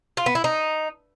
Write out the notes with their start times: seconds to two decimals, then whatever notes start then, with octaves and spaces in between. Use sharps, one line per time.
0.17 F4
0.26 B3
0.35 E4
0.44 D#4